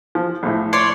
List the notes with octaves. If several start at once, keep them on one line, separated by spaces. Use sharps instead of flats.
F3
A#1 A2
C#5 D5 C6